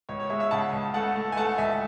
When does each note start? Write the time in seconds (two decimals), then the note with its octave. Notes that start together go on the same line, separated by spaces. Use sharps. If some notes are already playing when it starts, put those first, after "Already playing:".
0.09 C#2 C#5
0.20 C#5
0.30 G#3 C#5 E5
0.40 C#5 E5
0.51 C#3 F#5 A5
0.72 C#2
0.94 A3 F#5 A5
1.16 A3
1.32 G#5
1.37 A3 F#5 A5
1.58 C#2 E5 G#5